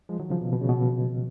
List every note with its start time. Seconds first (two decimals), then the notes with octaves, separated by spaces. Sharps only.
0.09 F3 G#3
0.20 D#3 F#3
0.30 C#3 F3
0.41 B2
0.53 B2
0.62 C#3
0.69 B2